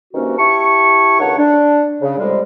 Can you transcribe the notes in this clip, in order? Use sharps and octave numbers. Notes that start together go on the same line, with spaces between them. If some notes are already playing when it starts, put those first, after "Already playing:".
G2 C3 D#3 A#3 C#4 F#4
E4 G4 A5 C#6
C#2 F#2 D#3 D4 C#5 F#5
D4
C#3
A2 C3 F3 G3 G#3